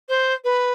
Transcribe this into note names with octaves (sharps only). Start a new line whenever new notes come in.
C5
B4